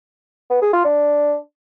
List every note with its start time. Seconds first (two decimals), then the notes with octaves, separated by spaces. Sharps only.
0.50 B3
0.62 G#4
0.73 F4
0.85 D4